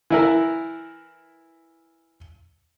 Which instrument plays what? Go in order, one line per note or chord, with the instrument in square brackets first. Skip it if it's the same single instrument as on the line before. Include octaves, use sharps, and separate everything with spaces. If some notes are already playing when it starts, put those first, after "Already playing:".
[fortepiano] E3 E4 A#4